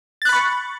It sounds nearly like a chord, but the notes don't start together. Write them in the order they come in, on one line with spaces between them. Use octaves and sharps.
A6 F#6 B5 C#6